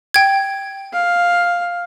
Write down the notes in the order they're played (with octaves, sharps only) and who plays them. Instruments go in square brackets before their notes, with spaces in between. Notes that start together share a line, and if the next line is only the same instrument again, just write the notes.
[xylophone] G5 G#6
[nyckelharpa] F5